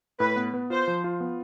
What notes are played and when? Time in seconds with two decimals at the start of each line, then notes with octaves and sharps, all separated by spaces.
0.19 A2 B4
0.36 B3
0.54 B3
0.70 F4 C5
0.87 F3
1.04 F4
1.20 B3